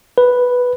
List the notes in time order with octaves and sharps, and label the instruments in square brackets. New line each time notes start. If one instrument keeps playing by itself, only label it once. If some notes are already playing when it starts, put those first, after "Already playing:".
[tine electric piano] B4